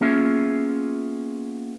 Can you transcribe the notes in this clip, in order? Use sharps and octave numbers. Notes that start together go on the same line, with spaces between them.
A#3 B3 C#4 F4 G#4 E5